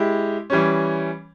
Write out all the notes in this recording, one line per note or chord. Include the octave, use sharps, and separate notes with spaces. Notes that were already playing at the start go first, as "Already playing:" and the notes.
Already playing: G#3 E4 G4
E3 G3 C#4